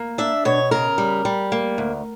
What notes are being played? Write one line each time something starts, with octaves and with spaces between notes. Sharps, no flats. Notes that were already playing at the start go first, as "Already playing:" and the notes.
Already playing: A#3
D4 E5
B2 C#5
C#3 A#4
G3
G3
A#3
D2